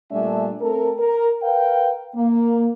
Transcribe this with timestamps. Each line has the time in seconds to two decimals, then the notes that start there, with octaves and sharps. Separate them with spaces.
0.12 A#2 G3 A3 D4 E5 G#5
0.61 A3 C4 A4 A#4
0.99 A#4
1.42 A#4 B4 F5 G5
2.15 A#3